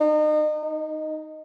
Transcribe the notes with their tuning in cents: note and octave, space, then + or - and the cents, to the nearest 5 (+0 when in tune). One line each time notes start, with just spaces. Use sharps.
D#4 -35
D#4 -5